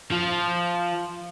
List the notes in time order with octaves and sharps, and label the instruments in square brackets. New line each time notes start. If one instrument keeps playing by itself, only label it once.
[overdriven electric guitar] F3